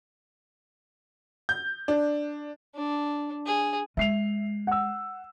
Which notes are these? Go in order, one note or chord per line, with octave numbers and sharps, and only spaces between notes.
G6
D4
D4
G#4
G#3 E5 C7 F7
F#5 E6